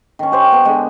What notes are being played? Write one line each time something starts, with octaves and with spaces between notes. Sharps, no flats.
D#3 C#4
G4 C5 C#5
B3 A5
D3 G#3